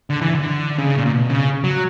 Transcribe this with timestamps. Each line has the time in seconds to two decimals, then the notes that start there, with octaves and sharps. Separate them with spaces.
0.10 D3
0.22 E3
0.35 D3
0.79 C#3
0.96 A#2
1.06 A#2
1.13 B2
1.30 C#3
1.64 F#3